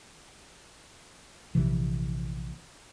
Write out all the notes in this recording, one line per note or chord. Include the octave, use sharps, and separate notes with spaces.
A#1 C3 E3